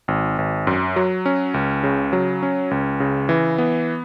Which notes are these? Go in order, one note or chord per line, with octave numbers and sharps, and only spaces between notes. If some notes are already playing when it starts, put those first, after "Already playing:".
G#1
G#1
F#2
F#3
C#4
C#2
C#3
F#3
C#4
C#2
C#3
E3
B3